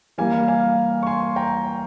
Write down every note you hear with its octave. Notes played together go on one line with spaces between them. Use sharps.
E3 G3 A#3 F5 G#5
F5 G#5
C#6
G#5 C6
G5 A#5